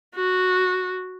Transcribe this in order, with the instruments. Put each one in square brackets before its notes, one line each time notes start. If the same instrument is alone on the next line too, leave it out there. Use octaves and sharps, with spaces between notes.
[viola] F#4